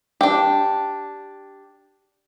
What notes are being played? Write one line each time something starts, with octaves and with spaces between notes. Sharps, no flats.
D4 G4